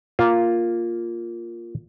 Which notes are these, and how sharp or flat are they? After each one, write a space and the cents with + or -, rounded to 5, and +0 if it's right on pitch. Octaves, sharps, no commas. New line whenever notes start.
A#3 +0 F4 +0